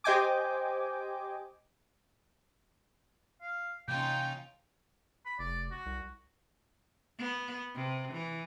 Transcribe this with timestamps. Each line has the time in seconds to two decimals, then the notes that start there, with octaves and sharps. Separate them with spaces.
0.04 G4 C5 D#5 G5 G#5 D6
3.42 F5
3.88 C3 E3 A#3 C#4 D#4 F4 G5
5.25 B5
5.39 F1 D5
5.71 F#4
5.86 C2
7.18 B3
7.75 C3
8.13 E3